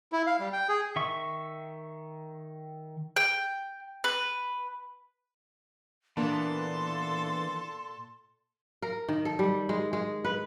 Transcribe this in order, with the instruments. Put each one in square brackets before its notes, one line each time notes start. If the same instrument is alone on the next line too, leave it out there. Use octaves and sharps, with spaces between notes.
[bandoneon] E4
F5
G3
G5
G#4
[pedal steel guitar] D#3 E5 C#6
[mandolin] G5
B4
[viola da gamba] A#2 A4 [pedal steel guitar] E3 [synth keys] A#3 B3 D4 [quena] C6
[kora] A#4
D#3
A4
G3
G#3
G#3
B4